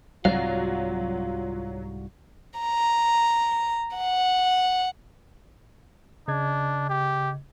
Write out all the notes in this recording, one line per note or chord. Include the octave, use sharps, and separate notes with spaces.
C2 G#2 F#3 F4 F#4 D5 F5
A#5
F#5
C#3 D4 D#5 G#6
G4